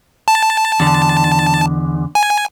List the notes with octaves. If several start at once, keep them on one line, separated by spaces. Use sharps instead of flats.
A5
E2 D3
G#5